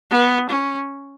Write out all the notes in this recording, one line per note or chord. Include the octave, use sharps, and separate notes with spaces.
B3
C#4